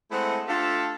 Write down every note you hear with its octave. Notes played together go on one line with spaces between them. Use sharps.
G#3 A3 C4 E4 D#5 F#5
A3 D4 F4 G4 A4